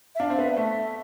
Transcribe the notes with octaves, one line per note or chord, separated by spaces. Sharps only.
E5
D4 F5
C4
B3 E5
A3